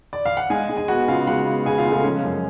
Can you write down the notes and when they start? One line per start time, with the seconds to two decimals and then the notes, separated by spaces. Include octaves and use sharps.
0.13 D5
0.26 F5
0.37 F#5
0.50 G#3 G#4 G#5
0.69 G#3
0.77 G#5
0.88 B3 F#4 F#5
1.08 C#3 F4 F5
1.27 G#3 F#4 F#5
1.46 B3
1.66 C#3 G#4 G#5
1.78 F4 F5
1.86 G#3
1.92 A3 A4
2.04 F3 C#4
2.23 F#2